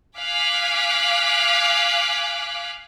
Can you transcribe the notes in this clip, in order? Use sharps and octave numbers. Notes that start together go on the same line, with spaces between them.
F5 G#5 D6 F#6 B6